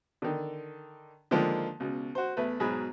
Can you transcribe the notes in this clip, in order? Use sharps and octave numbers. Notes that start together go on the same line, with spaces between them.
D3 D#3
D3 D#3 F3 G#3 A#3
C#2 B2
F#4 C5
E2 A3 B4
G#2 B2 F#3 G#4 B5